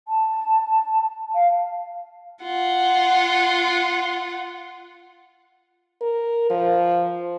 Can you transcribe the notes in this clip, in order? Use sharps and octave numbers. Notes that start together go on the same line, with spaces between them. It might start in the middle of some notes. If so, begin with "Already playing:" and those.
A5
F5
F4 F#5
A#4
F3